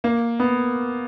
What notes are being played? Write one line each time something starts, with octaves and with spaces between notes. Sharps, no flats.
A#3
B3